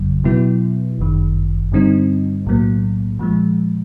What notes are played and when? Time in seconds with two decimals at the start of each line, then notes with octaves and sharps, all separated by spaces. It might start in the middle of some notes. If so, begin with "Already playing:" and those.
Already playing: G1 F2 C#3 F#3
0.24 B2 F#3 B3 E4
0.98 G1 F#2 D#3
1.72 G2 D3 G3 C4 D#4
2.46 B1 A2 F#3 A#3
3.19 A#2 F3 G#3